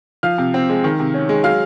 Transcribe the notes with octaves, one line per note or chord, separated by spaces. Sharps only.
F3 F5 F6
C3
C4
G#3
D#3
C3
C#4
G#3
F#3 F5 F6